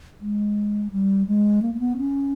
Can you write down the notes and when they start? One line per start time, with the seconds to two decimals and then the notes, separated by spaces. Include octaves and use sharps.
0.20 G#3
0.91 G3
1.27 G#3
1.62 A#3
1.74 A#3
1.79 B3
1.98 C#4